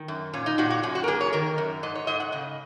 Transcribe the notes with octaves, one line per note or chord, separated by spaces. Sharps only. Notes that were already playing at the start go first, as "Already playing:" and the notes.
Already playing: D#3
F#2
A#2 C#4
D#4
A#2 F#4
F#4
F#2 C#4
F#4
A#4
A#3 G#4
C#5
D#3 A#4
F#2
G#2 D#5
C#5
G#2 D#5
F#5
C#3 D#5